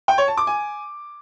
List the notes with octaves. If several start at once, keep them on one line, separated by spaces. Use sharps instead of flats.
G5
C#5
A5
D6
G#5